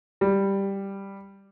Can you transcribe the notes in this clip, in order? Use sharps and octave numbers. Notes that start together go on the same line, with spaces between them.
G3